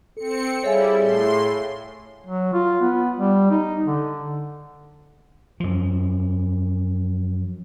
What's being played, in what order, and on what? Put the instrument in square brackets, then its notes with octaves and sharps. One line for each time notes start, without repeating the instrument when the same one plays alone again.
[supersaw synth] C4 C#7 [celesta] A4
[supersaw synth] G3 E4 [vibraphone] G#4 A4 F5 [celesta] C#5 E5 G#5
[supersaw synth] A2 C6
[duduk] F#3
F4
B3
G3
D#4
D3
[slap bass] F#2 F3